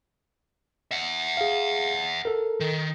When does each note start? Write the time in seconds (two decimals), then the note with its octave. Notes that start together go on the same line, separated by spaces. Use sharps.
0.91 E5 F#5
1.37 G#4 F5
2.25 A4 A#4
2.60 D#3